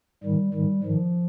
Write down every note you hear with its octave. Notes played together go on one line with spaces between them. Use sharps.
G#2 D#3 G3
G#2 D#3 G3
G#2 D#3 F3